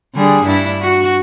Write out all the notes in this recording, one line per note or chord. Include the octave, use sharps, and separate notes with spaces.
D3 G3 G#4
G2 D4 E4
F#4